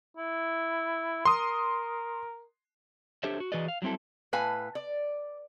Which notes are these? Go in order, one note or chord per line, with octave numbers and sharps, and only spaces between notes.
E4
A#4 C6 D#6
D4 G4 A4 C5 C#5 E5
F#4
E3 F#4 G#4 B4 D5 D#5
F5
F#3 G3 C4 E4 A4
A2 B4 F5 G#5
D5